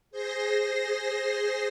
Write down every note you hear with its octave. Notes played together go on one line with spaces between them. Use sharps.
G#4 C5 C6 A#6